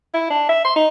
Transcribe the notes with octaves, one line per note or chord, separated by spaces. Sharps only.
E4
D4
E5
C6
D#4